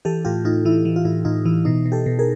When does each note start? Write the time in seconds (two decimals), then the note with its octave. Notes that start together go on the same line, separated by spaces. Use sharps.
0.05 E3 G4 A4
0.25 A2 F4 G4
0.45 A2 D#4 F4
0.65 E3 E4
0.85 E3
0.96 F4
1.05 A2 E4
1.25 A2 D#4 F4
1.45 E3 E4
1.65 B2 D#4
1.86 B2
1.92 G4 A4
2.06 B2
2.19 G#4 A#4